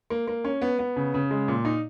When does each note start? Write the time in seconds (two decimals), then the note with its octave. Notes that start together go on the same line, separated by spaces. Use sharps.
0.10 A#3
0.28 A#3
0.44 C#4
0.62 B3
0.79 B3
0.96 C#3
1.14 C#3
1.31 G#3
1.48 A#2
1.65 D#4